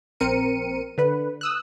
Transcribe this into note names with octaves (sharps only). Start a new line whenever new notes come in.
A#1 C4 A#4 C#7 D#7
D3 B4
D#6 E6 F#6